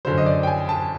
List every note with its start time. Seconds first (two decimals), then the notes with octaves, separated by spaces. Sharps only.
0.05 F#2 D3 F#3 C5
0.18 D#5
0.26 D5
0.43 G5
0.47 G#5
0.69 A5